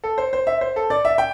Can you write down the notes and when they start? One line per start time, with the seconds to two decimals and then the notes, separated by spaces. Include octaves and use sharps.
0.04 A4
0.18 C5
0.33 C5
0.47 E5
0.61 C5
0.76 A4
0.90 D5
1.05 E5
1.18 G5